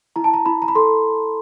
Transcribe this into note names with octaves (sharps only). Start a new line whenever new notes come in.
E4 A#5
A5
A#5
E4 B5
A#5
B5
A4 C6